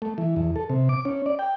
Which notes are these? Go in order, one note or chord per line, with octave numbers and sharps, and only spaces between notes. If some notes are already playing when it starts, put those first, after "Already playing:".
A3
E3
E2
A4
C3
D6
C#4
D5
G5